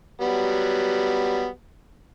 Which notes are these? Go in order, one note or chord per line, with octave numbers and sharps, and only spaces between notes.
F#3 G3 B3